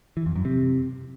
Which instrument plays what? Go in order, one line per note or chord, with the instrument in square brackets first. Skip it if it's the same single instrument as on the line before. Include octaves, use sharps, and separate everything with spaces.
[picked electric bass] E3
F2
F#2
C3